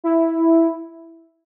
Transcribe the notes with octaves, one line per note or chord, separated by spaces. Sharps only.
E4